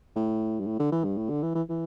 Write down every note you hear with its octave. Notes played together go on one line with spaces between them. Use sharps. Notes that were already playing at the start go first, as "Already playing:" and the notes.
A2
G2
A2
D3
E3
G2
A2
D3
E3
E3
E3